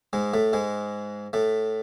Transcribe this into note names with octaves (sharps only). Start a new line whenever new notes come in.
G#2 G#3
A2 A3
G#2 G#3
A2 A3